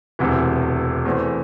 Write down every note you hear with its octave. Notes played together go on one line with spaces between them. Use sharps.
E1 D2 C3 E3
E2 E3 A3 C4